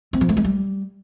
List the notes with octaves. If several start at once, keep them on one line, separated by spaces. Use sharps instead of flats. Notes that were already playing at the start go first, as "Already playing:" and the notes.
C4
F3
A3
G#3
G3